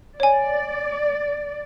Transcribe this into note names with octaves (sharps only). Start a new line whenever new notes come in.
C#5 D5 G#5